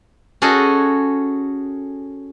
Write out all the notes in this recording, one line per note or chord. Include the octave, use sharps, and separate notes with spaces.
C#4 F#4 G#4 A4 D#5